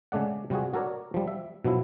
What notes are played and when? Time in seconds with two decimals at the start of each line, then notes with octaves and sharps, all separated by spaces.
0.12 C#3 G#3 A3 D5 F#5
0.50 C3 G3 F4 F#4 G#4
0.74 F#4 A4 A#4 C#5 D5
1.14 F3 G3
1.28 E5
1.64 B2 F3 F#3 E4